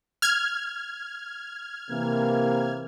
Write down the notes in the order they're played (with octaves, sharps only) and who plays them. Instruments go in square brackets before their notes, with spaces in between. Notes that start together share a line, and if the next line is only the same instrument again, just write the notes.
[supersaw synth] F6 G#6
[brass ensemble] C3 E3 A#3